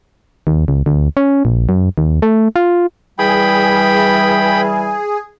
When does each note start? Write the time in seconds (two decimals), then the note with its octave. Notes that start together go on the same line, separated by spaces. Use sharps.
0.47 D#2
0.68 C#2
0.86 D2
1.17 C#4
1.45 A#1
1.69 F#2
1.98 D#2
2.22 A3
2.56 F4
3.19 E3 G3 G#4 G5 B5